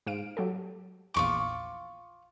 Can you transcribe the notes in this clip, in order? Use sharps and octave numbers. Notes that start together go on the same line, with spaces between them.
G#2 F5 D7
F#3 G4 A4
A#1 E2 F4 C#6 D6 C#7